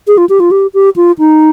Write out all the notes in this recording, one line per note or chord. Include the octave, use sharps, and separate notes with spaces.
G#4
F4
G4
F4
G4
G4
F4
D#4